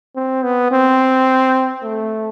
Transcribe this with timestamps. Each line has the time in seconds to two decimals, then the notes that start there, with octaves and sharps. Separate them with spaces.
0.16 C4
0.43 B3
0.71 C4
1.84 A3